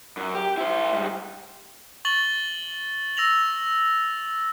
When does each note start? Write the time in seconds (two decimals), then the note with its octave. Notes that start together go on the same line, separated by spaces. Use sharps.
0.17 F#2
0.35 G4
0.57 E4 C5
0.92 G#2 G3
2.05 C#6 A6 F#7 G7
3.17 E6 A#6 F7 F#7